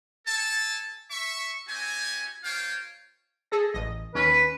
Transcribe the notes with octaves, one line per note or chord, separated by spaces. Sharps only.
A4 G#5 A5
E5 C#6
C4 E4 F#4 G4 G#5
A#3 F4 C5 C#5 F5 G5
G#4 A4 A#6
A1 D#5
D#2 C#4 B4